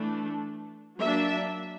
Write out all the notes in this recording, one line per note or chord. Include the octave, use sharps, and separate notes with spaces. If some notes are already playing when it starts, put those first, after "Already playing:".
Already playing: E3 A3 D4
F#3 A#3 D4 E5